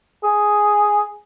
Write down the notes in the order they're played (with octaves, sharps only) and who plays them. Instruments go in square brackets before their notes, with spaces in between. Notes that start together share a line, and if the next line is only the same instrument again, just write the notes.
[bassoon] G#4